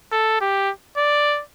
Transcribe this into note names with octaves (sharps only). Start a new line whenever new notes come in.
A4
G4
D5